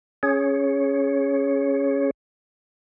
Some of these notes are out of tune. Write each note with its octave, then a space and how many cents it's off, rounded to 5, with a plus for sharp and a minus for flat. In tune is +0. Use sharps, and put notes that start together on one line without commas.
C#4 +0 G#4 +5 C#5 +0